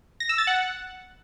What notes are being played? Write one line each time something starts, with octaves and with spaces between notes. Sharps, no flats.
A#6
E6
A6
F#5